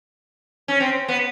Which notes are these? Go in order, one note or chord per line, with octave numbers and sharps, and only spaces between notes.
C#4
C4
B3